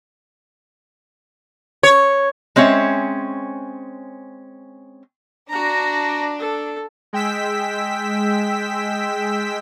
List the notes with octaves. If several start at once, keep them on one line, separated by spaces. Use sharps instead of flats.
C#5
G#3 C4 C#4 C#5 E5
D4 F#4 A#5
A4
G#3 G5 E6 B6